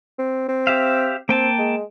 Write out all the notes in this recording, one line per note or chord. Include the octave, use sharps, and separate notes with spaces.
C4
C4
G4 E5 F5
A#3 C4 G5 A5
G#3